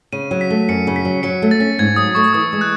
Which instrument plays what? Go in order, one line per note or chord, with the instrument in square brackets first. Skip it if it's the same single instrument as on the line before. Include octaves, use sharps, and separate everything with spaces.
[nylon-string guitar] C#3 [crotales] D#7
[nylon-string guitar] F#3
[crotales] B6
[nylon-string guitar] A3
[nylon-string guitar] F#2 [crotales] C#7
[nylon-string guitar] C#3
[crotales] B6
[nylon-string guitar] F#3
[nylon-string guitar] F#3 [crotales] C#7
[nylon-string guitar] A3
[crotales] A6
[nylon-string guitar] C#4
[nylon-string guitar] G#2 [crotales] G#6
[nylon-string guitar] F#3 [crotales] D#6
[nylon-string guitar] A3 [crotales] C#6
[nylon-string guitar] E3 [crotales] D#6
[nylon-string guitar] G#3
[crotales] F#6